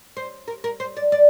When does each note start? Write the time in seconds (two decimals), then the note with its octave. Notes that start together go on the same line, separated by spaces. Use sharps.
0.17 C5
0.48 A#4
0.64 A#4
0.80 C5
0.97 D5
1.12 D5